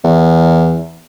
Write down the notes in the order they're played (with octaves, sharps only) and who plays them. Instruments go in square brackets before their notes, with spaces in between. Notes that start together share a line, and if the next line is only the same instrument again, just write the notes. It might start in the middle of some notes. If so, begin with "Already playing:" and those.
[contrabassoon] E2